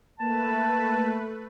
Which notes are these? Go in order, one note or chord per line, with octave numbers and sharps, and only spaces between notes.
A3 A#3 B4 A5